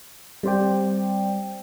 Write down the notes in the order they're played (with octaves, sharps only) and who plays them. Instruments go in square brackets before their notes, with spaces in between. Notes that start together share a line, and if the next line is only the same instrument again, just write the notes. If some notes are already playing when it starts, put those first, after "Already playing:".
[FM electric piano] G3 C4 C5 D5 G5